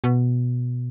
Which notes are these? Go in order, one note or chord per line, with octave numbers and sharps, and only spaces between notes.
B2